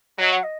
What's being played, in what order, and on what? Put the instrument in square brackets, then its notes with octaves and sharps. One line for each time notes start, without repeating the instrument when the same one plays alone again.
[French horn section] F#3 [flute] D#5
[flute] F#5
D#5